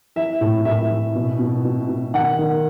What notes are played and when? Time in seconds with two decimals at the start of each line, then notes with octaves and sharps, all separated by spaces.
0.16 E3 E5
0.41 A2
0.65 A2 E5
0.91 E3
1.15 B2
1.39 B2
1.65 B2
1.89 B2
2.14 D#3 F#5
2.38 D#3